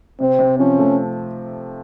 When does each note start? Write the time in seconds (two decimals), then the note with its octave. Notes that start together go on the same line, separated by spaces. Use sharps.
0.20 C3 C4
0.39 C3
0.58 F3 C#4
0.79 A3